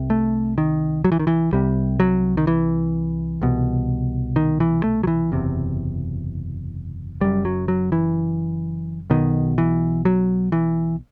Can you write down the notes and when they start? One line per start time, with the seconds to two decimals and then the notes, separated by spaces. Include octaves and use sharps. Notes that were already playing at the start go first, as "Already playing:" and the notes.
Already playing: C2 C3
0.10 A3
0.58 D#3
1.04 F#3
1.12 E3
1.19 D#3
1.27 E3
1.53 C2 C3 G3
2.00 F#3
2.37 D#3
2.47 E3
3.42 C2 B2
4.36 D#3
4.60 E3
4.84 A3
5.03 F#3
5.07 E3
5.32 F#1 E2 C3
7.21 F#1 F#2 G3
7.45 F#3
7.68 F#3
7.92 E3
9.10 B1 B2 D#3
9.58 E3
10.05 F#3
10.52 E3